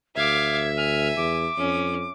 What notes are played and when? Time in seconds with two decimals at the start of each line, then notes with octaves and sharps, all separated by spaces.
0.16 D2 E5 F5 D6 G#6
0.77 G#5 F6
1.16 E2 D6
1.57 F2 C#4